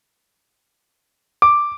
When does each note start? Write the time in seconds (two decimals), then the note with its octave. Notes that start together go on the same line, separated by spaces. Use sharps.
1.42 D6